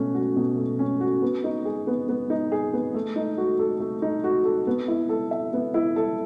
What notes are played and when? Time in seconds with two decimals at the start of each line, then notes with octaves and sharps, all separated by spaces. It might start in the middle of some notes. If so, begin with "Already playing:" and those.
Already playing: B2 A3 C#4
0.14 F#4
0.37 B2
0.57 A3
0.79 C#4
1.01 F#4
1.22 B3
1.44 D#4
1.65 G#4
1.87 B3
2.09 B3
2.30 D#4
2.52 G#4
2.74 B3
2.94 A3
3.16 D#4
3.38 F#4
3.59 A4
3.80 A3
4.02 D#4
4.24 F#4
4.45 A4
4.67 B3
4.88 E4
5.09 A4
5.31 E5
5.53 B3
5.74 E4
5.96 A4